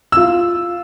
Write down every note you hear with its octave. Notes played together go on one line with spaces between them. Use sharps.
F4 E6